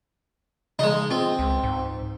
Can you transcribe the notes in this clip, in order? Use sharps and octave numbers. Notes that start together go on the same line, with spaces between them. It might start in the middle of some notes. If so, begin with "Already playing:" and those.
C#3 G#3 D#4
C4 F4
C#2
G#2